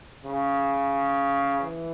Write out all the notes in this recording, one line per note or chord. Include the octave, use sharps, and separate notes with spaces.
C#3
E3